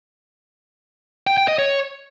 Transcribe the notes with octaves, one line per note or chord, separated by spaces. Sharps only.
G5
G5
D#5
C#5